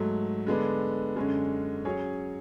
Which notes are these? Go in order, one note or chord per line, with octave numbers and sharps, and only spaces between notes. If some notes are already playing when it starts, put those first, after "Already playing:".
Already playing: G#2 F#3 A3
D3 G#3 B3 D4
F#2 D3 G#3 C#4
F#3 C#4 G#4 C#5